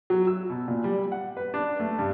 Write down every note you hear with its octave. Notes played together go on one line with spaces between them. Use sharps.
F#3
E6
B2
A#2
G3
F#5
B4
D4
A3
G2